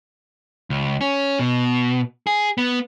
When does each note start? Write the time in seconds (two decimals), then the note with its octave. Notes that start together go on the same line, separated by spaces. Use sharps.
0.70 C#2
1.01 C#4
1.39 B2
2.27 G#4
2.58 B3